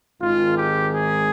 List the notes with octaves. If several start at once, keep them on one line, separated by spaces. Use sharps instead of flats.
G#1 G#2 D#3 G#3 F4
G4
G#4